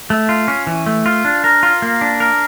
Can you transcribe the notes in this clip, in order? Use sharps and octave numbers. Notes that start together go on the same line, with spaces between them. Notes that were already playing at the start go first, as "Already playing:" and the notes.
A3
F4
C#4
E3
A3
F4
D4
A#4
F4
A#3
D4
A#4